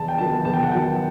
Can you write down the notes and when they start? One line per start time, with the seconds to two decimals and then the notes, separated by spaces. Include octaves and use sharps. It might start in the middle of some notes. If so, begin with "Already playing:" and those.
Already playing: E2 A5
0.08 G5
0.18 D#3 F#3 B3 A5
0.45 E2 A5
0.53 G5
0.63 F#5
0.71 D#3 F#3 B3 G5